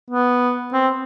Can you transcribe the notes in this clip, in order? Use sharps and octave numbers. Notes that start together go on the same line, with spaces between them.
B3
C4